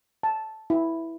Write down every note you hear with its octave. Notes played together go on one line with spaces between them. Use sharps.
A5
E4